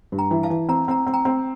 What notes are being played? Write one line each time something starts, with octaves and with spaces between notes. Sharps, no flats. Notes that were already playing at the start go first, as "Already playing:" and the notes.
G2
G5 A#5
E3
F5 A5
E3
C4 A#5
C4 A#5
C4
G5 A#5
C4